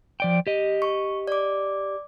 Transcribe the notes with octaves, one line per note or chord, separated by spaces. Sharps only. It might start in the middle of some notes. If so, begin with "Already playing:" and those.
F3 D5 G5
G4 D#5
C#6
D5 D6